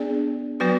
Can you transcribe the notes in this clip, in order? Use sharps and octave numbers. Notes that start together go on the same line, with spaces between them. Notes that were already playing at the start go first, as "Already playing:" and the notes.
Already playing: B3 D4 G#4 D5
F#3 B3 F#4 B4 D5